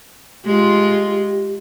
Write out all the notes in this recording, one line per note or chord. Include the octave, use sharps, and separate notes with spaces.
G#3 F4 G4